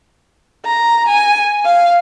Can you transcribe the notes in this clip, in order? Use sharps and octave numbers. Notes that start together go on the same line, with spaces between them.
A#5
G#5
F5